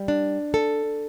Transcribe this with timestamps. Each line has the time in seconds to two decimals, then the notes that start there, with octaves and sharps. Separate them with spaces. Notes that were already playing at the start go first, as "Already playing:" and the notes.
Already playing: G3
0.08 D4
0.54 A4